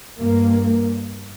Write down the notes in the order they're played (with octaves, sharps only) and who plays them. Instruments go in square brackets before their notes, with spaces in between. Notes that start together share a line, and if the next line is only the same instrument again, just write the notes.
[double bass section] G2 A#3